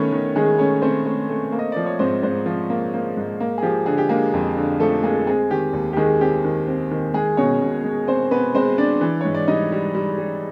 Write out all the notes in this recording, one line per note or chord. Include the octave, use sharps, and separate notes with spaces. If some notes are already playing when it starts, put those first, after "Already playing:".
Already playing: D#3 A3 B3 C#4 B4 C#5
D#3
D#3 G#3 G#4
A3 C#4 C#5
A3 C4 C5
A3
A3
A#3
D#5
F3 D5
C#5
G#2 C4 C5
G#2 C4 C5
F3
A#3
A#3
G#2
A#3
G#4
F3 G4
D3 G#4
G4
G#3 A#3 G#4
F2
D3
F3 A3 A4
G#3 A#3 G#4
G#3 C4 G#4
D#3 G4
D#2
G4
D#3 G#3 G#4
C4 G4
D#3
C4
D#3
G#3 G#4
B2 C#4 C#5
B2
G#3
C4 C5
B3 C4 B4
G#3 C4 C5
C4 D4 D5
E3
G#2 C#5
D5
G3 D#4 D#5
G3
G3
G3